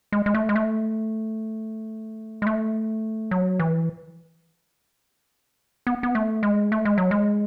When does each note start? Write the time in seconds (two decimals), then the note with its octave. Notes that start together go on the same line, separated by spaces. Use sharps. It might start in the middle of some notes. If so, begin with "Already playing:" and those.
0.12 G#3
0.26 G#3
0.34 A3
0.49 G#3
0.56 A3
2.42 G#3
2.47 A3
3.31 F#3
3.59 E3
5.87 B3
6.03 B3
6.15 A3
6.43 G#3
6.72 A3
6.85 G#3
6.98 F#3
7.11 G#3